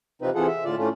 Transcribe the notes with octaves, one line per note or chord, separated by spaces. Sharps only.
F2 C3 F3 C4 D#4 B4
C3 E3 F4 G#4 A4 F#5
E5
A2 D3 F4 D5
A2 A3 C#4 D4 F4